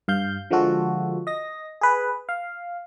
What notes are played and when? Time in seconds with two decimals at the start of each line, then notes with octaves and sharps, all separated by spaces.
0.08 G2 F5 G6
0.51 D3 F3 G#3 F4 F#4 A4
1.27 D#5 A#6
1.81 G#4 B4
2.29 F5